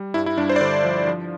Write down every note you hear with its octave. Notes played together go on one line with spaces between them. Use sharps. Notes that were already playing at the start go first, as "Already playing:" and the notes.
Already playing: G3
G2 E4
E4
G2 D4
C5
D5
D3 C5
F3
F3